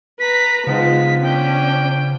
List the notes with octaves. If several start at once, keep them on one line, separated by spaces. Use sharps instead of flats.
B4 A#5 B6
C#3 F3 G#3 B3 D#4 B6
C#4 D4 G5